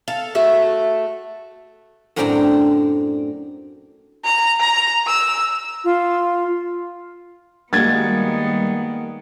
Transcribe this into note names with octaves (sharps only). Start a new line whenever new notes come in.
A4 F5
A3 F#4 E5
F#2 A2 C4 D4 G5 A#5
A#5
A#5
E6
F4
D#3 G3 G#3 A#3 B3 F#4 G#6 A6